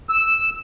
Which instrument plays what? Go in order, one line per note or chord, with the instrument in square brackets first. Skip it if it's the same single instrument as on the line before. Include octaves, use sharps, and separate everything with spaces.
[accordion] E6